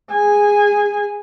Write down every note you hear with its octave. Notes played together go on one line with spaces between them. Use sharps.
G#4 G#5